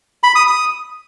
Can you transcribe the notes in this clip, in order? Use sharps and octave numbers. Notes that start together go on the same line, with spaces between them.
B5
D#6
D#6